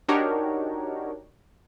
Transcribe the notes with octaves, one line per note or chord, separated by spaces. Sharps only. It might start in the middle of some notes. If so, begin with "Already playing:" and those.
D4 D#4 F#4 G4 A#4 C#5